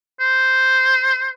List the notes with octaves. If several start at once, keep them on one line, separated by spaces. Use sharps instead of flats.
C5